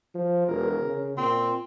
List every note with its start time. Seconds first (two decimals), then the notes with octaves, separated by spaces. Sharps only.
0.15 F3
0.48 E1 A#4
0.83 C#3
1.17 A#2 C4